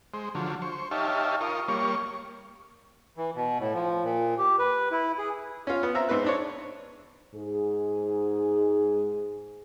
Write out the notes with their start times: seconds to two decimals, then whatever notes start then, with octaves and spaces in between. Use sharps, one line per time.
0.14 G#3 C5
0.35 D3 F3 F#3
0.62 C5 C#6
0.91 D#4 G4 C#5 E5 F5 A5
1.41 F4 A#4 C#6 D#6
1.68 G3 A#3 C#5 C#6
3.17 E3
3.36 B2
3.60 A2
3.74 F3
4.04 A#2
4.38 G4
4.59 B4
4.91 E4
5.19 G#4
5.67 C#4 F4
5.83 B3
5.95 C4 E5 A#5
6.09 G#2 C4 B4 F#6
6.24 C4 D4 C#5
7.34 G#2 G#4